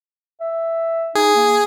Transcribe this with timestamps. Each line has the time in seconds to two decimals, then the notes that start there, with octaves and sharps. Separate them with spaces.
0.40 E5
1.15 D#4 G#4
1.36 A#3